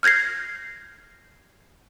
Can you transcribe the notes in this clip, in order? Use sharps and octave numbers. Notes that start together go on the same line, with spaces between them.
F6 G6 G#6 A#6 C7